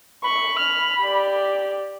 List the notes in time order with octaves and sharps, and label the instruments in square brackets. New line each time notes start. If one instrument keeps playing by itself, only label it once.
[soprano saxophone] B5 [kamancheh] C#6
[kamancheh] F6
G4 D5